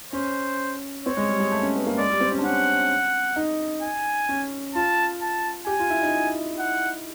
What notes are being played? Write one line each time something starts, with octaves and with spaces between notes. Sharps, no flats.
C#4 C5
C4 C#5
G#3
G3
G#3
A3
C#4
B3
A#3
G#3 D5
G3
C4
C#4
D4
C#4 F#5
D#4
G#5
C#4
F4 A5
A5
G4 G#5
F4
E4
D#4
F#5